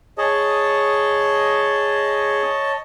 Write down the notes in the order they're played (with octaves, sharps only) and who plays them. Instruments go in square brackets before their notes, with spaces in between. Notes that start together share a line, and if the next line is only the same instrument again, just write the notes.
[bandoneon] G#4 [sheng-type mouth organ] C#5 D#5 A5